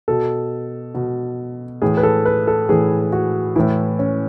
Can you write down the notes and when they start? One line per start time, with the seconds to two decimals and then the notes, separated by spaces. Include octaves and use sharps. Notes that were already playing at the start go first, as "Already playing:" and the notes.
0.08 B2 A4
0.95 B2
1.82 A2 E3 G#4
1.97 B4
2.03 A4
2.25 B4
2.47 A4
2.69 A2 E3 G#4
3.12 F#4
3.56 A2 E3 E4
3.99 C#4